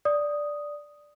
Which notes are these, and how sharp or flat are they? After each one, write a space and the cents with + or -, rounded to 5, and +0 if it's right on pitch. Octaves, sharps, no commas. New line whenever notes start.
D5 +0 D#6 +0